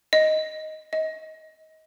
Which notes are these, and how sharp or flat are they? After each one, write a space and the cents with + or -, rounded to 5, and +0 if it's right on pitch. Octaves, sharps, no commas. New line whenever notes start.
D#5 +5
D#5 +25